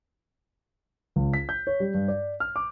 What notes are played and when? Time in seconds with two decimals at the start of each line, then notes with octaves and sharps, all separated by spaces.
1.16 C#2
1.34 B6
1.49 G6
1.67 C#5
1.80 G3
1.94 G2
2.08 D5
2.40 F6
2.56 D6